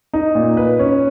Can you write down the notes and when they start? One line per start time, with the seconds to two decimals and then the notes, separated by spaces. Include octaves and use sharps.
0.13 D#4
0.35 A#2
0.57 B4
0.79 C#4